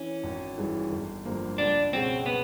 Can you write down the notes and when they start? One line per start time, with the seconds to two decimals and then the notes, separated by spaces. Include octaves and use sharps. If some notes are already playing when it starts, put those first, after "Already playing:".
Already playing: E3 C#4
0.24 G#1
0.58 G2 E3 G#3
0.92 G1
1.25 G2 D3 F3 A#3
1.58 C#2 D4
1.93 B2 G#3 C4 C#4 F#4
2.26 B3